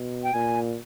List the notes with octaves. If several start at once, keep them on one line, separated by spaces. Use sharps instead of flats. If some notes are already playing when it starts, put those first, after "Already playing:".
Already playing: B2
G5
A#2 G#5